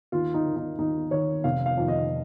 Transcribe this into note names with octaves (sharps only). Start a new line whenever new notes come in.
D#2 F4
D#4
D#3
D#4
D#2 D#4
D#3 C#5
F1 F5
F5
F2 D#3
D#5